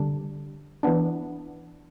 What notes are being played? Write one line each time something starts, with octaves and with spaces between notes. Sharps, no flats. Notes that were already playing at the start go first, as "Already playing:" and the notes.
Already playing: D3 G3 D4
E3 B3 D4